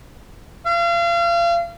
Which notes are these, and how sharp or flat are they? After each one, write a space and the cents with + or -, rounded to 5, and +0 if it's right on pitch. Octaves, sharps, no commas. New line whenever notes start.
F5 -35